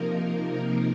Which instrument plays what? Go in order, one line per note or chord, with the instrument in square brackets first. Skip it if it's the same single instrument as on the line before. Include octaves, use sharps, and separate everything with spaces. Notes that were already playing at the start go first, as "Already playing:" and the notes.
Already playing: [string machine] C3 F3 A#3 D#4 A#4